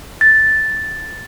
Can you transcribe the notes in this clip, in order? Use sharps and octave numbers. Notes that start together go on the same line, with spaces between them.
A6